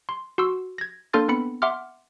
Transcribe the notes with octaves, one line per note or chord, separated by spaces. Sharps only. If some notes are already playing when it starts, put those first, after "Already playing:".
C6
F#4 C6 E6
G#6 A#6
A#3 D4 A4 C6 F6 A6
B3 C4 B5 C#7
E5 F#5 C6 D6 F6